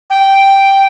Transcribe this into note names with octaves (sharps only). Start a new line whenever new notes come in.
G5